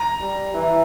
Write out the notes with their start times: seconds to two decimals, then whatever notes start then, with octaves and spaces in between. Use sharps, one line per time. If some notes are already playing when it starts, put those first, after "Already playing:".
Already playing: A#5
0.20 G3
0.54 E3